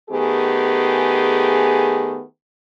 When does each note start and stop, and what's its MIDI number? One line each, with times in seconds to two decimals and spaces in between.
0.10 2.23 51
0.10 2.23 57
0.10 2.23 59
0.10 2.23 67
0.10 2.23 68